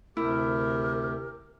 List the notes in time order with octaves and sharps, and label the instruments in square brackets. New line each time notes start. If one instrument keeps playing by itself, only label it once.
[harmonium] D2 C3 G4 [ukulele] E4 [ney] A#4